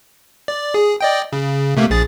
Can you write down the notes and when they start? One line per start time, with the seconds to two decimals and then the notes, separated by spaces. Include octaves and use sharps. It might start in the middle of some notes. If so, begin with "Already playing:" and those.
0.48 D5
0.74 G#4
1.01 D5 D#5 G5
1.33 C#3
1.77 C3 A3 A#3
1.90 A#1 G#4 A6